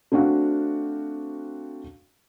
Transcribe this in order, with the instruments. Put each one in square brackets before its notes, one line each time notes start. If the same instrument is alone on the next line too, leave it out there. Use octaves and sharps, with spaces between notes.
[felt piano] A3 C4 D4 F#4 F5